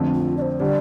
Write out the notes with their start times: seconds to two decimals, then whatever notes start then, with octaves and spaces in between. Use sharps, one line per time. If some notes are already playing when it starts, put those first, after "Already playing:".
Already playing: F2 D3 A3 C4
0.14 F4
0.37 D5
0.42 C5
0.60 D3 G3 D5